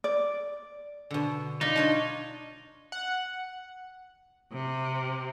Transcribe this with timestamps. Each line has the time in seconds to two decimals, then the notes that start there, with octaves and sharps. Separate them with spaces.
0.04 D5
1.11 B2 D3
1.61 D#4 F4 B4 D5
1.76 D4 F4 C#5
2.92 F#5
4.52 C3